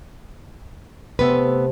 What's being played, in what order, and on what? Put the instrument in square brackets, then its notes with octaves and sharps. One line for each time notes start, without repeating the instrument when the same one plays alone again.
[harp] C3 A3 [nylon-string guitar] B3 B4